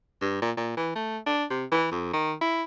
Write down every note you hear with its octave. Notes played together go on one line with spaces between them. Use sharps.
G2
A#2
A#2
E3
A3
D4
C3
E3
F2
D#3
E4